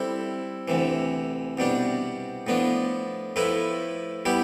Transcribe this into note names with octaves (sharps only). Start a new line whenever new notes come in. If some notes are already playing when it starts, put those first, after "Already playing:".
Already playing: G3 C4 E4 A4 E5
D2 C3 E3
C2 B2 G3 D4
A2 F3 B3 D4
A2 F3 A3 E4 B4
G3 B3 E4 G4